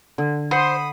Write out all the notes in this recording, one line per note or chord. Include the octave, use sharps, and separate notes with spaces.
D3
C5 F#5 B5 D#6 C7 C#7